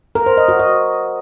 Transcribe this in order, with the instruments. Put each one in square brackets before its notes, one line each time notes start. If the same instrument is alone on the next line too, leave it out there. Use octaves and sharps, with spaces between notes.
[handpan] A#4
C5
D#5
F#4
D#5